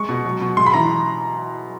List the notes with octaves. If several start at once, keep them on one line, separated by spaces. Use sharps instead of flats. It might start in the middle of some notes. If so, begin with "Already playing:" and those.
Already playing: G#3 C#6
B2
F#3
B2
G#3 C6
B5
E3 A#5